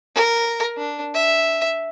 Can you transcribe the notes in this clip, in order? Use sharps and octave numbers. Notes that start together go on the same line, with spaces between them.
A#4
D4
E5